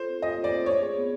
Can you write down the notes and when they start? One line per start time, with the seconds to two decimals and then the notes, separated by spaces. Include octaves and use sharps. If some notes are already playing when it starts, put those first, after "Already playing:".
Already playing: F4 A4 C5
0.09 C4
0.22 F4 D#5
0.37 F4
0.44 D5
0.51 C4
0.66 D4 C#5
0.80 G#4
0.95 B3